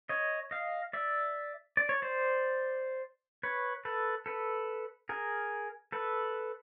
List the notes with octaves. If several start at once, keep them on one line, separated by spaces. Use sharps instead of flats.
C#5 D#5
D#5 F5
D5 E5
D5
C#5
C5 D5
B4 C#5
A4 B4
A4 B4
G#4 A#4
A4 B4